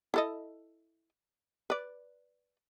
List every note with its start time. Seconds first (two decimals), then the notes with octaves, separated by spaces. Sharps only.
0.14 E4 A4 D#5
1.70 B4 D5